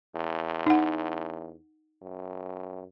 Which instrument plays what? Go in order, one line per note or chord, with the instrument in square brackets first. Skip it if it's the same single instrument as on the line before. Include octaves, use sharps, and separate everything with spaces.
[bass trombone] E2
[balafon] D#4 F#5
[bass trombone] F#2